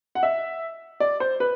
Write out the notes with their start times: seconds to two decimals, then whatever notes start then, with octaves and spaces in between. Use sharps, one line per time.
0.15 F#5
0.23 E5
1.00 D5
1.20 C5
1.40 B4